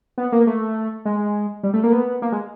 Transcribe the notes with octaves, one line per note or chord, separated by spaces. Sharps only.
B3
A#3
A3
G#3
G3
A3
A#3
B3
A#3
G#3